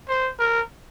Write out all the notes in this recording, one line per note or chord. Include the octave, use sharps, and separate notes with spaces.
C5
A#4